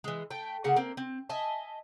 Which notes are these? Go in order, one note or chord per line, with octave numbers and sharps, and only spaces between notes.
E3 G#3
A3 G5
C#3 A#3 G#4 F#5
A#3 C4
C4
D#5 E5 G#5 A5